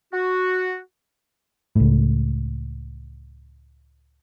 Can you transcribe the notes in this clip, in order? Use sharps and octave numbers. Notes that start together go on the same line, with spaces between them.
F#4
C#2 A2